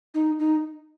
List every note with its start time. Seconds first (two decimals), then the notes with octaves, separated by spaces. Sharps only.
0.14 D#4
0.39 D#4